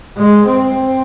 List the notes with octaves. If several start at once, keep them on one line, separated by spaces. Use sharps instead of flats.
G#3
C4